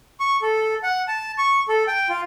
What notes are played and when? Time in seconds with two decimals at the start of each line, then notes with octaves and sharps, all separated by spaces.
0.20 C#6
0.42 A4
0.83 F#5
1.08 A5
1.38 C#6
1.68 A4
1.88 G5
2.09 F4